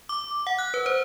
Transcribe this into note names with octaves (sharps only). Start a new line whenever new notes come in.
D6
F#5
F#6
B4
C5